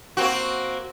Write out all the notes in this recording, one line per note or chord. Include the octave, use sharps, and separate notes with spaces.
A#3 C4 F#4